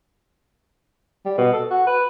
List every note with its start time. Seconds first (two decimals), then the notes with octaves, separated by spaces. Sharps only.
1.25 G3
1.38 B2
1.53 A4
1.70 F#4
1.87 B4